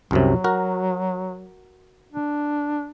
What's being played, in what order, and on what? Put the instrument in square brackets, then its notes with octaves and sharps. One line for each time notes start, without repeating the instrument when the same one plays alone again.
[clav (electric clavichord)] C2 F#2 C3 [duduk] F#3
[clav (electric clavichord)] F#4 A#4
[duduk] D4